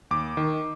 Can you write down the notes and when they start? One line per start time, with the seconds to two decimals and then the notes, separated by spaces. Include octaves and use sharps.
0.11 D#2 D6
0.37 D#3